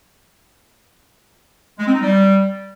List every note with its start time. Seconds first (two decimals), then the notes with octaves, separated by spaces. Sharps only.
1.79 G#3
1.86 C4
1.94 D#4
2.01 G3